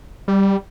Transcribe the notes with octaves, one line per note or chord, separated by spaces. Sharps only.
G3